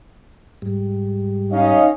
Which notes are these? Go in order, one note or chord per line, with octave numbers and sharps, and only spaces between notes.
G#2 G3
C#4 D#4 D#5 F5